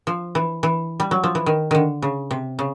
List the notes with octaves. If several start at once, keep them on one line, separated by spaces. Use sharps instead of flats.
F3
E3
E3
G3
F#3
F3
E3
D#3
D3 D#3
C#3
C3
C#3